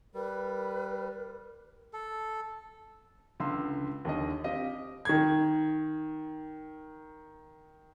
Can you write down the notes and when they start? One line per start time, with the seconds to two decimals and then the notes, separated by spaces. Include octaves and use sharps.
0.14 G3 A#4 B4
1.93 A4
3.40 C#2 D3 C6 E6
4.05 D#2 D3 D#5
4.44 C4 G4 D#5 F5
5.05 D#3 G#6